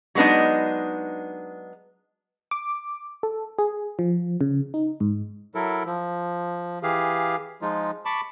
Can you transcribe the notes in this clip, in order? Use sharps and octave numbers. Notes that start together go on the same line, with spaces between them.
F#3 G#3 B3 D4 D#4
D6
A4
G#4
F3
C#3
D#4
G#2
F#3 E4 A4 A#4
F3
E3 G4 G#4 F5
F3 G#3 D#4 F4
A5 B5 C#6 D6